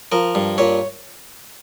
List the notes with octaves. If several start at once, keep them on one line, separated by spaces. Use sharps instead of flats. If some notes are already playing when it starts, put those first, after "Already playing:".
F3 A#4
G2
A#2 C#5